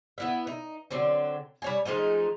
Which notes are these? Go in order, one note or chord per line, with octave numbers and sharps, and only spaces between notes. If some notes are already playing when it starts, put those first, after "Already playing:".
B3 E4 E5
D#4
D3 F#3 C4
G3 C#5 G#5
F3 G#3 A3 D#4